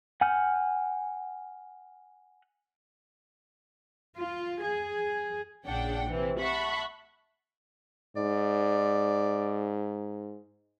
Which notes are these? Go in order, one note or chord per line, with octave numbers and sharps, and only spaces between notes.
F#5 G#5 F6 G6
F4
G#4
A#1 C#3 D4 F#5 G5
C3 E3 C4
E5 F#5 A5 B5 C#6
G#2 D5